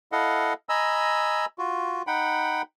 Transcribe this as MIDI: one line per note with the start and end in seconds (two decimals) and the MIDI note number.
0.12 0.53 64
0.12 0.53 69
0.12 0.53 75
0.12 0.53 77
0.12 0.53 78
0.69 1.46 75
0.69 1.46 80
0.69 1.46 82
0.69 1.46 83
0.69 1.46 88
1.58 2.02 65
1.58 2.02 66
2.07 2.62 63
2.07 2.62 78
2.07 2.62 79
2.07 2.62 83